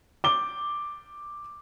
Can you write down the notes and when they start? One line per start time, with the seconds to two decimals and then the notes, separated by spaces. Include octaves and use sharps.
0.24 D6 G7